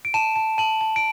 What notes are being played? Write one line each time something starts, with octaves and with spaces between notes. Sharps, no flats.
D7
A5 E7
A5
A5 F#7
A5
D7